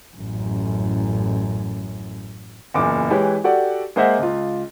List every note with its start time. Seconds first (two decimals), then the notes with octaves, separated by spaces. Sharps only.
0.17 A1 F#2
2.74 F#1 E2 A#2 D6
3.10 E3 G#3 E4 G4 B4 C#5
3.44 F#4 G4 A4 D5 F#5
3.96 G#3 A#3 C5 D#5 E5 F#5
4.18 C#2 F4